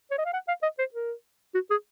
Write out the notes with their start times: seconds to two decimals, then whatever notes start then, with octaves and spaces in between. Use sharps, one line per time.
0.11 C#5
0.18 D#5
0.26 F5
0.33 F#5
0.48 F5
0.63 D#5
0.79 C5
0.94 A#4
1.54 F#4
1.71 G#4